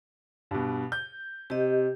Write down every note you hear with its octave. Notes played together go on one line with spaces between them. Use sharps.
G2 B2
G6
C3 G4 D#5